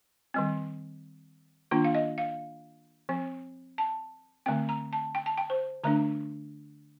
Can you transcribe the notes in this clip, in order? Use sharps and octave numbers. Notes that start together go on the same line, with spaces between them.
D#3 G3 C4
D#3 A#3 D4 F4
F5
D#5
F5
F3 C4
A5
D3 A3 C4 G5
A#5
A5
G5
A5
G5
C5
D3 A3 D4 A#5